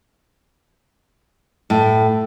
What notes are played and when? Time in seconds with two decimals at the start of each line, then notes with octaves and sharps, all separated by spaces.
1.70 A2